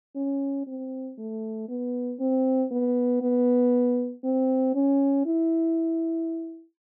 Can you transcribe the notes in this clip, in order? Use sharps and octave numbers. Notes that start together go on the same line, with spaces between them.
C#4
C4
A3
B3
C4
B3
B3
C4
C#4
E4